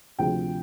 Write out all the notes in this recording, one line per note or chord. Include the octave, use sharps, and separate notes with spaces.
D2 C3 F3 G5